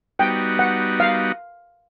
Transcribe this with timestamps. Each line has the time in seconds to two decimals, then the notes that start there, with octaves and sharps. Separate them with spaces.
0.19 G3 B3 D#4 F#4 G5
0.59 F#5
1.00 F5